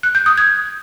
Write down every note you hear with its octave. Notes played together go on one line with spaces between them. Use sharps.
F#6
G6
D#6
G#6